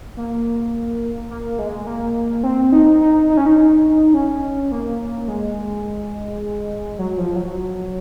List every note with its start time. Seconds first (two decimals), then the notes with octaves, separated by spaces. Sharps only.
0.17 A#3
1.30 A#3
1.59 G#3
1.87 A#3
2.43 C4
2.72 D#4
3.01 D#4
3.29 D#4
3.37 C#4
3.46 D#4
3.58 D#4
4.14 C#4
4.72 A#3
5.28 G#3
6.99 F#3
7.18 F3
7.36 F#3